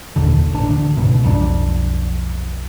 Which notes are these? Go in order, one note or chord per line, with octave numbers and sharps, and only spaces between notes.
F1 A#1 D#2 D3
A1 D4
D2 D3
D1 C#2 G#2 B2
B1 F2 A3 D4